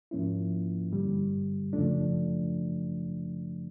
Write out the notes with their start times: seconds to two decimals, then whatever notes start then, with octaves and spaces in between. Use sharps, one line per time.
0.11 G#2 F3 A#3 C#4 E4
0.92 G2 D3 G3
1.73 F#2 C#3 F3 A3 D4